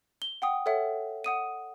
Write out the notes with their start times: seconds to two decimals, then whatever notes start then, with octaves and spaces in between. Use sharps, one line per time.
0.22 G7
0.42 F#5 G5 D#6
0.66 A4 C#5 E5 F#5
1.24 F#5 D#6 D#7